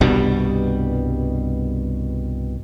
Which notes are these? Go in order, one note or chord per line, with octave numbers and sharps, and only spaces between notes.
C2 G2 B2 G3